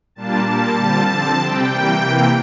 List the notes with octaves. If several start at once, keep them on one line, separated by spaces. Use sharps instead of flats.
A#2 G3 A#3 D4 F4 A5
A#2 G3 A#3 A5
D3 G3 C4 F4
D3 F3 C4 A5
C3 G3 C4 G5
E3 G3 A#3
C3 E3 A#3